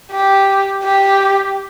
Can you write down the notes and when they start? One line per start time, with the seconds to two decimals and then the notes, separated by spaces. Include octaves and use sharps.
0.12 G4
0.84 G4